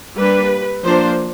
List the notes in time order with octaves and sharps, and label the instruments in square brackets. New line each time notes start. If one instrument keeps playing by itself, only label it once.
[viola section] G3 A#3 D4 B4
F3 A#3 D4 C5